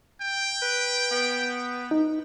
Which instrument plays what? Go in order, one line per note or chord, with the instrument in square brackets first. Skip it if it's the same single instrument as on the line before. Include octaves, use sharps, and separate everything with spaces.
[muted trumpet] G5
[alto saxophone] B4
B3
[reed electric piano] D#4